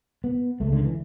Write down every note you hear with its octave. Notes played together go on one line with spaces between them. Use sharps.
B3
C#2 C#3 A3
D3
E3